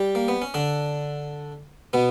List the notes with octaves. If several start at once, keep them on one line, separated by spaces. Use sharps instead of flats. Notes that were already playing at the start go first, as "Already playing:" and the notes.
Already playing: G3 G4
A#3
B3
C#4
D3 D4
B2 B3